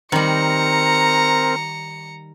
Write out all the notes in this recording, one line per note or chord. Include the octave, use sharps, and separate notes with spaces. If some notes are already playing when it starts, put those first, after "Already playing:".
D#3 G3 C4 A#4 A#5 C#7